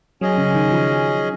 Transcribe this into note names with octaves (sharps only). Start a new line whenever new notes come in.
F#3 C#4 G#4 D#5
C#3
D#3
F3